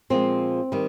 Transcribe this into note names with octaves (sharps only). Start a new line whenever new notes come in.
A#2 F3 G#3 C4
D#3 G3